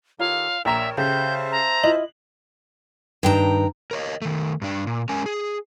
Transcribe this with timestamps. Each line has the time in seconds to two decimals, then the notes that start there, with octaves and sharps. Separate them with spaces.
0.19 D#3 F4 G4 A4 C#5 F5 A#5
0.65 A#1 G4 A#4 C#5 E5 A#5 E7
0.97 C#3 G4 A4 C5 E5 A5 G6
1.52 A#5
1.83 E4 F4 D#5 F#7
3.23 G2 D#3 D4 G5 A5 A#5
3.91 A#4 C#5 D#5
4.22 D#3 A3
4.62 G2 D4
4.87 A#2
5.09 G#3 C#4 A#4 G#5
5.26 G#4